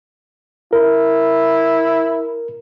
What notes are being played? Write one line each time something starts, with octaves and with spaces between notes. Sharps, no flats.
E4 A#4